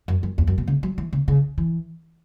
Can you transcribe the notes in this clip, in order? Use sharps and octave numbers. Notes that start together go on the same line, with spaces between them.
F#2
F#2
E2
F#2
B2
C#3
F#3
E3
C#3
C#3
E3